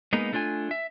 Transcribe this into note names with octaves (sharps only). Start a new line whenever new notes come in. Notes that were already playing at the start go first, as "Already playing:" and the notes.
G#3 A#3 B3 D#4
A3 D4 F4 D5 G#5
E5